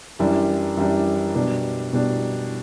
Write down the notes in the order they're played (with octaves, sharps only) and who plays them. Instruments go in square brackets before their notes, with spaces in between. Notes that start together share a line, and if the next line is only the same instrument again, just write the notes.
[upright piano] F#2 E3 G3 D4
F#2 E3 G3 D4
B2 G3 D4
B2 G3 D4